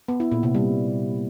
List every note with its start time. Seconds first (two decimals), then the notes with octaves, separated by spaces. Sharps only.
0.08 B3
0.20 E4
0.31 A#2
0.43 C3
0.55 G3